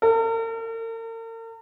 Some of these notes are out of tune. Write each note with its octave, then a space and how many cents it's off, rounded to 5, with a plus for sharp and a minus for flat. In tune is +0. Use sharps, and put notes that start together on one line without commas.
A#4 -45